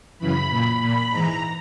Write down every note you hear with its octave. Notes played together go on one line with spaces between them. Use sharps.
F#2 C#3 E3 B5
A#2
A#2 B5
G#2 E3 A#5